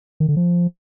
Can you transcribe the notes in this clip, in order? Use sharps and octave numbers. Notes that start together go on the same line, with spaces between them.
D#3
D3
F3